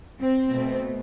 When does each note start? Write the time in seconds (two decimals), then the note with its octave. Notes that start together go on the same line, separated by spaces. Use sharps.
0.21 C4
0.51 B2 A3